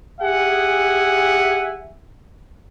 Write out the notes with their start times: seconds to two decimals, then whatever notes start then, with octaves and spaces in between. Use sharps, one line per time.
0.21 G4 G#4 E5 F#5 G#5